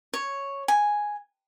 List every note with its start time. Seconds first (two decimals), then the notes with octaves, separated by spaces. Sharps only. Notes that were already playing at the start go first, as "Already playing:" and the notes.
0.14 C#5
0.68 G#5